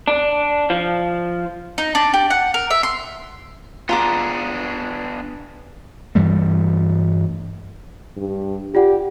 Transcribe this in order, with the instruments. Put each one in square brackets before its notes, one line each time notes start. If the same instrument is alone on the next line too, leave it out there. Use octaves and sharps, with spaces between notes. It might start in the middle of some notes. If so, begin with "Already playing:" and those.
[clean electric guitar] D4
F3
[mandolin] D#4
D4
G4
F#5
A#4
E5
C6
[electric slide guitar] B3 D4 G#4 [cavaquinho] F4 A#5 D6
[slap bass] G2 E3 G3 A3
[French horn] G2
[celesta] F4 D5 F#5 [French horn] G4